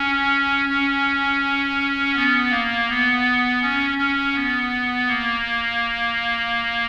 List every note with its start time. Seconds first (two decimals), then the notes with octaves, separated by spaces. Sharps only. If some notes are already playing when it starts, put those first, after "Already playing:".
Already playing: C#4
0.69 C#4
2.15 B3
2.51 A#3
2.88 B3
3.62 C#4
3.97 C#4
4.35 B3
5.08 A#3